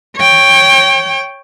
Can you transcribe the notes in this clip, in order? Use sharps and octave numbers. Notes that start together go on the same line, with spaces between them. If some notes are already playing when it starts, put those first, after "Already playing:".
C#5 G5